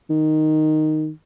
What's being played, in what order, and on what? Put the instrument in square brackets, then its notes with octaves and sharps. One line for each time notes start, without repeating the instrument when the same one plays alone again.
[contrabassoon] D#3